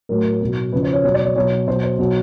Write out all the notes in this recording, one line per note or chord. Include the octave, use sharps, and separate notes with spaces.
A2 F#3 A#4
B2 F#3
C#3 F3 B4
C5
C#5
B2 F#3 C#5
D5
C#5
B2 F#3 C#5
B2 F#3 C5
C5
B2 F#3